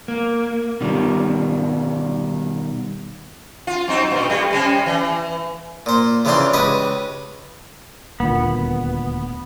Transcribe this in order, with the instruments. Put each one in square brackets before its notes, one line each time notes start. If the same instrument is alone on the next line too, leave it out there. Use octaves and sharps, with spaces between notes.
[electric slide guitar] A#3
B2 D#3 G3
[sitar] F4
F#3 C4 D#4
G2 A#2
G3 A3
C3 G3 C#4
E3
[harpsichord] A#2 C5
C#3 E3 F3 D4 G5 C6
C#2 G4 B4 D#5 B5
[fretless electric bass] D#1 D2 A#2 [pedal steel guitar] B3